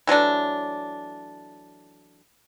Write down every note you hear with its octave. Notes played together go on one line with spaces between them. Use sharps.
E3 F#3 A3 D4